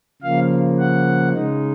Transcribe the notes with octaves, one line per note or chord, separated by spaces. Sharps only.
C#3 F3 A#3 F5
F#5
C#3 G#3 D#4